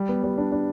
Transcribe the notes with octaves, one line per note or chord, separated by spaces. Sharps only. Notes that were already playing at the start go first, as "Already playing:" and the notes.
Already playing: G3
B3
G3
D4
D4